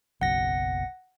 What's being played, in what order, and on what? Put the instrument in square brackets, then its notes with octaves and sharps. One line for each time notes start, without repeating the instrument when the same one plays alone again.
[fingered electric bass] F#1 B1 [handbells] F#5 A#6